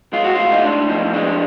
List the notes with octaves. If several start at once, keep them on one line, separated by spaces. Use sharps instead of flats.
G#3 F4
F#4
A2 F4
D#4
A2 D4
F3 D#4
G#3 D4